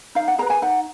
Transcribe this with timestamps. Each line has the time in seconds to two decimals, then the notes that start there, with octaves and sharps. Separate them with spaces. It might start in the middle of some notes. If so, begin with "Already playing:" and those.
0.15 D#4 F5
0.28 F#5
0.38 G#4 A#5
0.42 B4
0.50 G#5
0.62 D#4 F#5